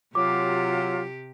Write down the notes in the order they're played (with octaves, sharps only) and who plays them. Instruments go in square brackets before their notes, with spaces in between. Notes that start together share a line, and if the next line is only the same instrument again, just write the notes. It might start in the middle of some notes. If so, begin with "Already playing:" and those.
[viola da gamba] C3 G4 [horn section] F#3 [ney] F4 [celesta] D6